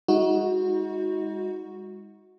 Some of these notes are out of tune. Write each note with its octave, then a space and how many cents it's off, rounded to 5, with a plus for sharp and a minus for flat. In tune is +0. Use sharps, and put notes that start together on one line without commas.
G#3 -35 D#4 +35 F#4 -10